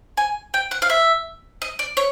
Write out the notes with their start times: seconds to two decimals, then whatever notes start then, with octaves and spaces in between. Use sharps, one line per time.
0.17 G#5
0.54 G5
0.71 F#5
0.82 F5
0.90 E5
1.62 D#5
1.79 D5
1.97 C#5